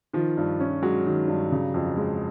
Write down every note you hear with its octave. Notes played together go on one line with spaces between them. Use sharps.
D#3 F3
G2
C#4
F#3 G#3
D#3
G2
C#3
F2
G#3